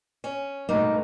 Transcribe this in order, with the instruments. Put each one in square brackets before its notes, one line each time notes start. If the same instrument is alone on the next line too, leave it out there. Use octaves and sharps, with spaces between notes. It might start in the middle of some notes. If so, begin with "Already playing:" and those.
[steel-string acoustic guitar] C#4
[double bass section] G2 B2 A3 [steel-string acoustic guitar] A#3 [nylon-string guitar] D#4